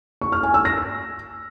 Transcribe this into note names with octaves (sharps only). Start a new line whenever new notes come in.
C#6
F6
G#5
E6
A#6